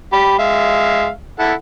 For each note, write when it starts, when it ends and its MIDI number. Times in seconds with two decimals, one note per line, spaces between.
0.13 0.35 67
0.13 0.35 83
0.38 1.09 56
0.38 1.09 76
0.38 1.09 77
1.39 1.53 64
1.39 1.53 69
1.39 1.53 78